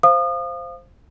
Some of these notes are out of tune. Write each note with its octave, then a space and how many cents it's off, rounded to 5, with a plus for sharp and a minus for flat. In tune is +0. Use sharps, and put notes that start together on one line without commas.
C5 +0 F5 -15 D#6 -35